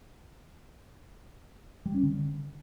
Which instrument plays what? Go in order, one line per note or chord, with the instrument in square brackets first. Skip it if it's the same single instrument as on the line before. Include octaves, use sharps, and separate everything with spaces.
[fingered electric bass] G3
C#4
D3